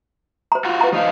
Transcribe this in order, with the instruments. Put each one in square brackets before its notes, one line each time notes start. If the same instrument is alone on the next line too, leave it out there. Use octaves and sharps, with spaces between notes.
[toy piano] C5 A#5
[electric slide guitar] F4 F#4
[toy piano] B4 A#5
[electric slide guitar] F3 D#4 F5